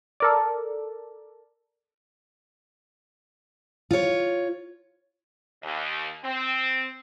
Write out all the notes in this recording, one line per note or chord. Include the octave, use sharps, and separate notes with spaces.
A4 A#4 D5
F4 C#5
D#2
C4